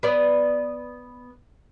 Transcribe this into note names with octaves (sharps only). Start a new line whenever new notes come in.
B3 D5